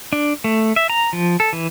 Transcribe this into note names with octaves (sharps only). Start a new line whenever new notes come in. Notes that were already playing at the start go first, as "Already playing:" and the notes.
D4
A3
E5
A#5
F3
A4
E3